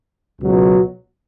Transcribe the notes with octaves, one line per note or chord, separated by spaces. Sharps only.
C#2 B2 F#3